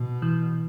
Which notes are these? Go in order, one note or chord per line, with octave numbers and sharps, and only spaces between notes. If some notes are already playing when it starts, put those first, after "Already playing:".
Already playing: B2
E3